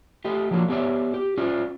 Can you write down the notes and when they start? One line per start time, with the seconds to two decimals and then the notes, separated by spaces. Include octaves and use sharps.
0.25 A3 G4 D#5
0.51 F3 F#3 A#3 D4 F4
0.68 A3 B3 G4 C#5 D5 E5
1.14 G4
1.37 C#4 F4 D5